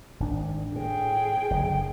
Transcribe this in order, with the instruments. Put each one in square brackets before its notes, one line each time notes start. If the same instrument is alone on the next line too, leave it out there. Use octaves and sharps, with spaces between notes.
[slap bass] G#1 D#3 D4
[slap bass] A2 [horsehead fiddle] G#4 G5
[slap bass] F#1 D3